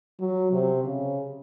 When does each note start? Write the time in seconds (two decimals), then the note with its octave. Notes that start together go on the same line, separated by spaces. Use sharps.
0.20 F#3
0.52 C3
0.84 C#3